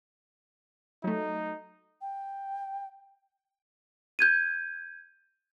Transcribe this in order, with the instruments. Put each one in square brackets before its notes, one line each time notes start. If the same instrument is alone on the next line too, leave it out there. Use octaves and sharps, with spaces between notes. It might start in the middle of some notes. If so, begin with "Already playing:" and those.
[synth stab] F#3 A3 [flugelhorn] D#4
[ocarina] G5
[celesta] G6 G#6 D#7